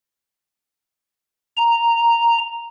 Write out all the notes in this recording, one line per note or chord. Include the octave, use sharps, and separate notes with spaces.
A#5